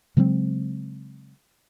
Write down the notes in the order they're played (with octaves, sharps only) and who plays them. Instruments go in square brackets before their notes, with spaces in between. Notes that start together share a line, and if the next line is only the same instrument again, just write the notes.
[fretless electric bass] C#3 F#3 G#3 C4